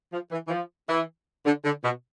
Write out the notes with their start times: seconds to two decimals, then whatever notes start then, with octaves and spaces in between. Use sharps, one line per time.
0.12 F3
0.31 E3
0.46 E3
0.49 F3
0.88 E3
1.45 D3
1.64 D3
1.83 B2